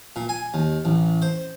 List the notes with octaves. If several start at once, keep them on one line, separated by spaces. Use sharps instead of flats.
A#2
G#5
D#2
A1
C5